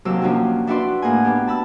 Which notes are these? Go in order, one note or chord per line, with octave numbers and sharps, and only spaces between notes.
D#2 C3 F#3 G4 E6
F3 A#3 C#4 D4 F#4 G4
D4 E4 F#4 B4 D5 C6
A2 A#3 G#4 F#5 G#5
B3 D4 G4
A5 B5 E6